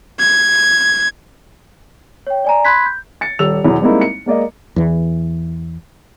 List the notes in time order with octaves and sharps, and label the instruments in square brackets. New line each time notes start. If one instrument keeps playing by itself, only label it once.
[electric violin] G#6
[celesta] C#5 G5
D5 G#5 A#5
B5 C6 F#6 G#6 B6
G6
[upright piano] A6 C#7
D#1 G4 E6 F7
E2 B2 E3 F#3
G3 G#3 A#3 C4 D#4 E4
C#7
G#3 A#3 D5 D#5
[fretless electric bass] E2 E3